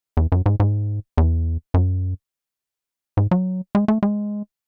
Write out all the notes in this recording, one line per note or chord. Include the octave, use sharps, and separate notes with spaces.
E2
F#2
G#2
G#2
E2
F#2
G#2
F#3
G#3
A3
G#3